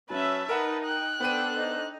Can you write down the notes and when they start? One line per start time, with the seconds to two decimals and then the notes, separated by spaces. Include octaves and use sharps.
0.10 F#3 C#4 B4 E5 A5
0.49 D#4 A#4 B4 F#5
0.85 G5 F#6
1.20 B3 D4 A4 B4 C5 G5 D#7
1.55 D#4